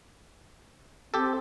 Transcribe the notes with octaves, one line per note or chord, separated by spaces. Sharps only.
C4 G4 A4